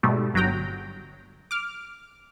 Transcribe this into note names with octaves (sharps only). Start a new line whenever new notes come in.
G#2 B2 G3 A3
G1 F#3 F#4 G5 A#5
D6 F6